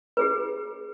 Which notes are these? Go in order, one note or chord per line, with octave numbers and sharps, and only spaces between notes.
G4 G#4 B4